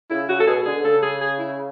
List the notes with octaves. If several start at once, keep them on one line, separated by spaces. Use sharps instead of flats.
C#3 E4
C#3 F#4
A4
B2 G#4
D3 G#4
C#3 A4
G#4
G#4
E4